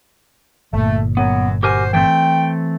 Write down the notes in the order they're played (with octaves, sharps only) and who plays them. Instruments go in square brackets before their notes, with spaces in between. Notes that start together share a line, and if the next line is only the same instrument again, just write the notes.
[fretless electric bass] G1 A#2 [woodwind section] A3
[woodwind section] F#2 F#3 [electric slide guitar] B3
[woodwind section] F#4 C5 [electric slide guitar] G4 A#4 G#5
[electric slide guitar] E3 A3 C4 [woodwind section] G5